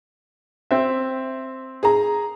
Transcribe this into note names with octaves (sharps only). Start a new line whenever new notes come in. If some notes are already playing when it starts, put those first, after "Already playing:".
C4 E5
G#4 A#5